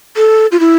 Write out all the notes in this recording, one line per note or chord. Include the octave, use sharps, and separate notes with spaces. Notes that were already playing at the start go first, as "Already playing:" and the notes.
A4
F4
E4